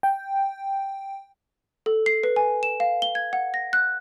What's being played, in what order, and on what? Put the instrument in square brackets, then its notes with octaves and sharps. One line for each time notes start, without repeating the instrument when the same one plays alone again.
[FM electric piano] G5
[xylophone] A4
C7
B4
G#5
E7
F5
G7
G#6
F#5
A#6
F#6